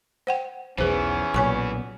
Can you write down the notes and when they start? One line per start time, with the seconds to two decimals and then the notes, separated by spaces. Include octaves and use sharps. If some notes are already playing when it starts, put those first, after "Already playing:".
0.27 C5 F#5 G5
0.78 B1 E2 E3 B3 C#4 G#4 C5
1.34 B1 A#2 C#5 G#5 C#6